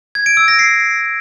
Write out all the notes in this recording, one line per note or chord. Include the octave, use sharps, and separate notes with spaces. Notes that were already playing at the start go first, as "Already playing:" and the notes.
G#6
D7
E6
A#6
C7